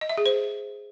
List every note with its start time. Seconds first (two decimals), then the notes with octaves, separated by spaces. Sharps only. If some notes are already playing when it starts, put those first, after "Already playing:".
0.01 D#5
0.09 E5
0.18 G#4
0.26 C5